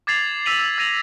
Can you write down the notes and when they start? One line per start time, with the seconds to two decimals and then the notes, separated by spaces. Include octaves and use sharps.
0.07 D6 G#6 A6 C7 F7 F#7
0.46 E6 B6 C7 D#7 F7 F#7
0.59 E6
0.78 E6 G#6 A#6 D#7 F7